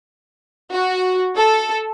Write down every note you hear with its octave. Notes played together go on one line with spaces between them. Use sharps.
F#4
A4